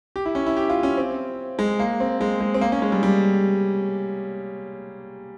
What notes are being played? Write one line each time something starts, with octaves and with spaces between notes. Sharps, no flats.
G4
E4
C#4
E4
G4
F4
C#4
C4
G#3
A#3
C4
G#3
G#3
C4
A#3
C#4
G#3
G3
G3